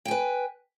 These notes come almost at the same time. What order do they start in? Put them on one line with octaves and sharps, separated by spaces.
G5 G#5 B4